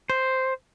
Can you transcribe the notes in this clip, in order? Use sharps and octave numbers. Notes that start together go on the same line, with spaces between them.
C5